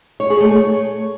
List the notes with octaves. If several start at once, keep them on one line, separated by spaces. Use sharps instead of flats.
C#5
G#4
A3
C#5